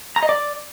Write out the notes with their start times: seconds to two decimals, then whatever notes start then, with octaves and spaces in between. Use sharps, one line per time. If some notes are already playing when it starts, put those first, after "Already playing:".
0.16 A#5
0.23 D#5
0.29 D5